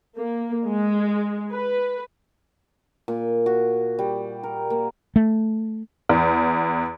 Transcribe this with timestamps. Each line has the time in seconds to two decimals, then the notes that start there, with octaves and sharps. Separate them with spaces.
0.17 A#3
0.66 G#3
1.52 B4
3.08 A#2
3.46 F#4
3.99 G3
4.43 A#4
4.70 A#3
5.16 A3
6.09 E2